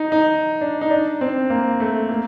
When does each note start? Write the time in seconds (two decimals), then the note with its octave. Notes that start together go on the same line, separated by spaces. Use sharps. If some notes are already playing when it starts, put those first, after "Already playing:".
Already playing: D#4
0.12 D#4
0.61 D4
0.81 D#4
0.90 D4
1.21 C4
1.50 A#3
1.80 A3
2.09 A#3